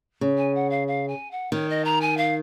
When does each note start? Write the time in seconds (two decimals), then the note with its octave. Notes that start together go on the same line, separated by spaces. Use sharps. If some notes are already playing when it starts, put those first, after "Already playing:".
0.21 C#3
0.37 G#5
0.54 F#5
0.70 F5
0.87 F5
1.08 G#5
1.31 F#5
1.52 D#3 C#5
1.69 D#5
1.84 A#5
2.01 G#5
2.17 F5